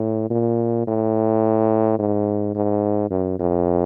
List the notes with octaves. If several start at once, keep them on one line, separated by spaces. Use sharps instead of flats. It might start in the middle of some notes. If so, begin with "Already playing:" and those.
Already playing: A2
A#2
A2
G#2
G#2
F#2
F2